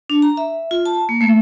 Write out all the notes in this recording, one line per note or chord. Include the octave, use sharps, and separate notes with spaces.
D4
A#5
E5
F4
A5
A#3
A3